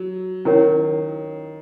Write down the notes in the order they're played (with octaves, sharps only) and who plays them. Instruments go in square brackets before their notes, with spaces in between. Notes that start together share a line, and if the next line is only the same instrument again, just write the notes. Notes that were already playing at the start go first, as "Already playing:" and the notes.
Already playing: [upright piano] F#3
[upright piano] D#3 [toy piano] C#4 E4 A#4 C#5